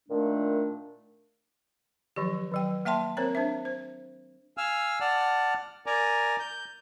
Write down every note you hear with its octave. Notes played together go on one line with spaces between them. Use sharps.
A#2 D#3 A3 D4
D#3 F3 F#3 G4
D#3 F#3 G5
A#3 E5 G5 A5 C6
C4 A#4 C5 C#5 A#5
D4 C5 E5
C5
F5 G#5 E6 F6
D5 F#5 A5 F6
A#4 D5 G#5 A#5
G6